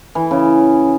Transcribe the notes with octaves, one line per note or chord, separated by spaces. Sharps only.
E3
C#3